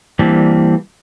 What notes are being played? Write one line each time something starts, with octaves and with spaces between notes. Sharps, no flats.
E3 G3 A#3 C4 D4